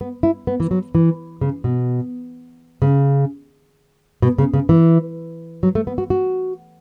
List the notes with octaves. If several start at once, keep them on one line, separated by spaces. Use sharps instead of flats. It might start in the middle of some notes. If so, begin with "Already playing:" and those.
B3
E4
B3
E3
F#3
E3
C#3
B2
C#3
B2
C#3
C#3
E3
F#3
A3
B3
F#4
F#4